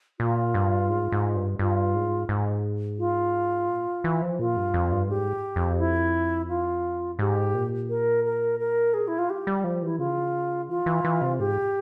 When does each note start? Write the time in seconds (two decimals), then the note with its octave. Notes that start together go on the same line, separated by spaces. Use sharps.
0.20 A#2 F4
0.54 G2
0.89 G#2
1.12 G#2
1.36 G2
1.59 G2 F4
1.94 G#2
2.29 G#2
2.99 F4
3.69 A#2
4.04 E3
4.22 F3
4.39 A#2 F4
4.57 G2
4.74 F2
4.92 G2
5.09 G#2 G4
5.56 F2
5.79 E4
6.49 F4
7.19 G#2 G4
7.54 A#2
7.89 A#4
8.25 A#4
8.60 A#4
8.94 G#4
9.08 E4
9.19 F4
9.29 G#3 G4
9.47 G3
9.64 F3
9.82 E3 E4
9.99 C#3 F4
10.69 E3 F4
10.86 E3
11.05 E3
11.22 C3
11.39 G#2 G4